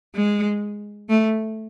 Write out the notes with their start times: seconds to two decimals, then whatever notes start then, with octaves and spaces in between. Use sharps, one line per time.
0.15 G#3
1.09 A3